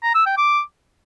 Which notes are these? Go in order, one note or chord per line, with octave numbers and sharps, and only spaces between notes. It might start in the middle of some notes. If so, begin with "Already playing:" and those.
A#5
E6
G5
D6